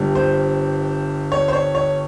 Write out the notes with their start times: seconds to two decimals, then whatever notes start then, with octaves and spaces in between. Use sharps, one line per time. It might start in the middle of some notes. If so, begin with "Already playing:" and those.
Already playing: G1 G2 G3
0.15 C5
1.32 C#5
1.48 C5
1.53 C#5
1.75 C#5